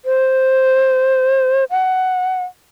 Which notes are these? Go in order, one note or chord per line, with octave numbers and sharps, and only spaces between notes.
C5
F#5